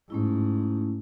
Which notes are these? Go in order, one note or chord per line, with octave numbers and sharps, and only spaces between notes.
G#2 A3 C#4 E4